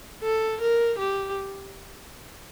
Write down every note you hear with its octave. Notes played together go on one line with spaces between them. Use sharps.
A4
A#4
G4